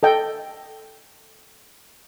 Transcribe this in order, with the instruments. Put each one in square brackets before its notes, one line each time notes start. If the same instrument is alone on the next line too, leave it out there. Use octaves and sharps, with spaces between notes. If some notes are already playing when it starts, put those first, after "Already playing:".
[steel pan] A4 D#5 G5